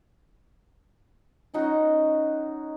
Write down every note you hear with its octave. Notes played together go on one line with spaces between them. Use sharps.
C#4 D#4 F#4